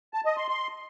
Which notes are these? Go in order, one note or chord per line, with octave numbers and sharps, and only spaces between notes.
A5
D#5
C6
C6